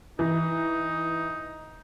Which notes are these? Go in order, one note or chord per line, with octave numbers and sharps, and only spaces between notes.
E3 D#4